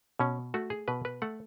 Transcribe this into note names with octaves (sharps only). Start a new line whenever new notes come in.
B2 C#4
A3 F#4
G#4
B2 B4
B4
A3 F#5